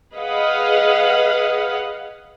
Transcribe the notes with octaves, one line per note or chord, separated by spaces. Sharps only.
G#4 B4 D#5 F5 F#5